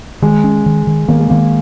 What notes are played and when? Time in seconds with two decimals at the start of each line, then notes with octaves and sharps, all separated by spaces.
0.22 D#3 G#3
0.44 C#4
0.66 D#3
0.87 D#3
1.08 D#3 A#3
1.20 G#3
1.30 D#3 A#3